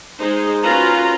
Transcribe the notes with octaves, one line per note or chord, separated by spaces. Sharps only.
G#3 D#4 G#4 C5
C#4 F4 F#4 A#4 B4 A#5